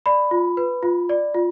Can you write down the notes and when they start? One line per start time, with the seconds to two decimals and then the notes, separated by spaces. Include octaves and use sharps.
0.06 D5 B5
0.31 F4
0.57 B4
0.83 F4
1.09 D5
1.34 F4